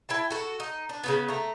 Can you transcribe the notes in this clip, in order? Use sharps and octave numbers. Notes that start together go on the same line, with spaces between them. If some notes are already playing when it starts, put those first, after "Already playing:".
E4 G5 A5
F#4 A4
D#4
D4
C#3 E3 B3
A3 A#5